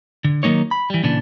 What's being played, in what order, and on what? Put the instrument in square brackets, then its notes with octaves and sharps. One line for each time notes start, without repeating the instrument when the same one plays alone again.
[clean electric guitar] D3
D#3 F#3 A#3 D#4 C#5
B5
E3 G3
A#2 C#3 E3 D4